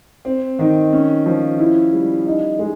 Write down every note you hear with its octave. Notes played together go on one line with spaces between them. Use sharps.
C4
D#3
C#4
F3
E4
G3
D#4
G#3